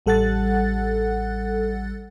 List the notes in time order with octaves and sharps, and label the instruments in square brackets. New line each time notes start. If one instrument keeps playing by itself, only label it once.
[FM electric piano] A1 G3 A4 F#5 F#6 A6